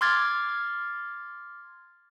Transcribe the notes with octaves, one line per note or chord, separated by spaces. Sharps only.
C6 D6 F6 G#6 A6